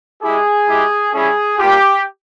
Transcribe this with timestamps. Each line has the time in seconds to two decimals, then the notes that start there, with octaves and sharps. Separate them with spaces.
0.22 G#3 E4 G4 G#4
0.68 G#3 E4 G4
1.13 G3 C#4 E4 G#4
1.59 G3 A#3 F4 G4